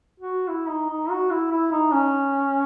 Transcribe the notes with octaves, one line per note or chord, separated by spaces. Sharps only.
F#4
E4
D#4
D#4
F#4
E4
E4
D#4
C#4